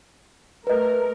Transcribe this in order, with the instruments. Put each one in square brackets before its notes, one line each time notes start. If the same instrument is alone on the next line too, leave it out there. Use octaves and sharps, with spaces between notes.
[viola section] A3 A#4 [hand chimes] B4 D#5